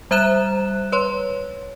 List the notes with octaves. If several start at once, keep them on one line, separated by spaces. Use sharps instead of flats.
G3 C5 E5 A#5 F#6 E7
B4 C#5 C6